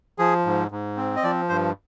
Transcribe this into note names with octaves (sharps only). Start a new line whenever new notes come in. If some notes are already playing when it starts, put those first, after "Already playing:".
F3 G#4
G#2
G#2
C4
D#5
F3 D5
G2 C5